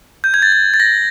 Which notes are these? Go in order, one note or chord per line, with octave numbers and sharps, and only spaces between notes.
G6
G#6
A6
A6
A6
A#6